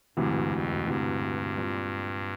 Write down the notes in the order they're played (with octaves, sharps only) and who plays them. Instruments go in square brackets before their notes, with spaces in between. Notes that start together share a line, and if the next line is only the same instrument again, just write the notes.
[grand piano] E1 D2 C3 E3 [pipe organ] G2
[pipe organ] F2
[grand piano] E1 D2 C3 E3 [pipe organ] G2
[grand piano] A#2 G3 C4